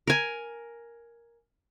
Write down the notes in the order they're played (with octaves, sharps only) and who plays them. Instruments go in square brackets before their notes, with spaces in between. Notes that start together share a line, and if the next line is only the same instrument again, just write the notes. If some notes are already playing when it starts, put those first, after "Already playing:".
[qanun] A#4 G#5